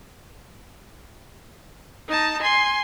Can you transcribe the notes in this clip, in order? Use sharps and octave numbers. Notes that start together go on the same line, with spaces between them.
D#4 A5
G#5 C6